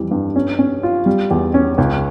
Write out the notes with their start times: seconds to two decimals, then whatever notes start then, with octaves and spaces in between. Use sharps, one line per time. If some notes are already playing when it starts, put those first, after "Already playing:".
Already playing: F2 E3 G3
0.11 G2
0.36 C#4
0.59 C#4
0.83 F4
1.06 G3
1.31 E2
1.54 C#4
1.78 C#2